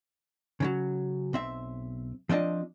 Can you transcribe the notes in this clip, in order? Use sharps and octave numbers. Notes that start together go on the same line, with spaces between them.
C#3 E3 F#3
B1 C4 E5
F3 C4 D4 D#5